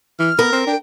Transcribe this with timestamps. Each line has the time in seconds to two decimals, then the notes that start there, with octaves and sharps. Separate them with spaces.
0.19 E3 F6
0.39 B3 A#4
0.52 C4
0.67 D4 G5